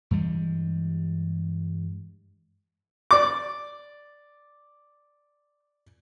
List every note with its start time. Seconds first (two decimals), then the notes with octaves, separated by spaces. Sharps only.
0.11 G2 E3 G3 G#3
3.11 D5 D6